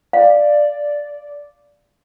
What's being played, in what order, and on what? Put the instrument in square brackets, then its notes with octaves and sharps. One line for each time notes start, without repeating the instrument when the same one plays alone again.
[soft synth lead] D5 [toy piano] F5